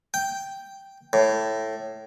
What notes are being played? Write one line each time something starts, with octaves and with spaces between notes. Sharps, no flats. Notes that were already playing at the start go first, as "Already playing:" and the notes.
G5
A2